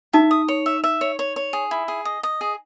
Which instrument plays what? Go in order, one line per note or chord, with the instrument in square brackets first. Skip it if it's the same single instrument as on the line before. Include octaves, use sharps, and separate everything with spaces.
[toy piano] D#4 [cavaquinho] E5
[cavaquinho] D#6
C#5
E5
E5
C#5
C#5
C#5
G#4
E4
G#4
D#5
D#5
G#4